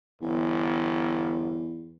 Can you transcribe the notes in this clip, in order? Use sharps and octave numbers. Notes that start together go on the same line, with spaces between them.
G1 E2